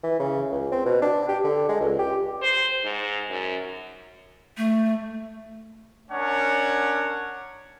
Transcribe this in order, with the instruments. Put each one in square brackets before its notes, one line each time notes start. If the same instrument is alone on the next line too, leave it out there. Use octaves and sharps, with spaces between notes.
[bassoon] E3
C#3
C#2
C4
B2
D4
G4
D3
G#3
C#2
G4
[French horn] C5
G#2
F#2
[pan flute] A3
[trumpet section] C#4 D4 A#4 C#5 F#5